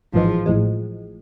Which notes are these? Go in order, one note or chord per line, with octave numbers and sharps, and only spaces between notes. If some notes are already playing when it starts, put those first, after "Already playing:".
A1 G#2 E3 F3 G#3
A1 A2 F3 G#3